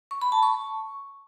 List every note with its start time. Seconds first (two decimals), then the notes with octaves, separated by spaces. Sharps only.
0.11 C#6
0.22 B5
0.32 A5
0.43 C#6